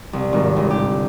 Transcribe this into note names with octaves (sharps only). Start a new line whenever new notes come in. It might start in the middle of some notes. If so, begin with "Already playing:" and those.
C2
G#1
G1
G4